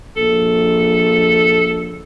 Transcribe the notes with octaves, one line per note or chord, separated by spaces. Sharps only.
A#1 A4